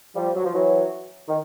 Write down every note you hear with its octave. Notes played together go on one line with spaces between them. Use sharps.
F3 G3
F#3
F3
E3 F#3
D#3